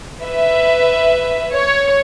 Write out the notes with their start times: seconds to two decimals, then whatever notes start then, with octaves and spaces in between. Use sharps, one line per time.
0.23 B4 E5
1.53 C#5